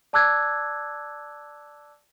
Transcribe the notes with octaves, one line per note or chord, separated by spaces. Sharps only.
D5 A5 D6 E6 F#6 G#6